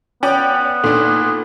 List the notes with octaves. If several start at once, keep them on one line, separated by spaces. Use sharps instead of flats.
B3 C#4 D5 G5
A#2 D4 D#4 A4